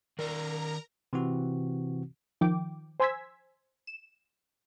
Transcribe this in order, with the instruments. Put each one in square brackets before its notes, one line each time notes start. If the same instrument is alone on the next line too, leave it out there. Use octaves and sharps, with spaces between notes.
[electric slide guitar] D#3 D5 [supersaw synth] A#4 A#5
[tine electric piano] C3 E3 C4 F#4
[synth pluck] D#3 F3 G5 D6
C5 G#5 C6 E6 G#6 B6
E7